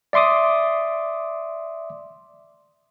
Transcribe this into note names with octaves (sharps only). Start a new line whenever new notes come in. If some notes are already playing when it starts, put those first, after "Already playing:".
D5 E5 C6 D6 D#6